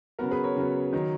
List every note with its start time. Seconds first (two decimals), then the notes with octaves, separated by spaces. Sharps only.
0.19 C#3 F#3 B3 F#4 A#4
0.31 G#4 B4
0.44 A#4 C#5
0.56 C#3 F#3 B3
0.93 D#3 F#3